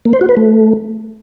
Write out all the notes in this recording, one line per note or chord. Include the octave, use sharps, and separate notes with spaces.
A#3
C5
F#4
B4
A3